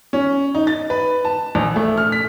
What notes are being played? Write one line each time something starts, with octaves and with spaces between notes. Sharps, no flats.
C#4
D#4
A6
B4
A5
A#1
A3
F6
B6